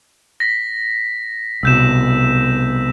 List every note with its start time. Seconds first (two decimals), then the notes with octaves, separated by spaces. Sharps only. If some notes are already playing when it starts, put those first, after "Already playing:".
0.40 A#6 B6
1.63 C2 B2 E6 G6 E7